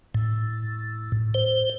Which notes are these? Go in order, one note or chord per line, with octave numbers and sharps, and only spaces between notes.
A2
C5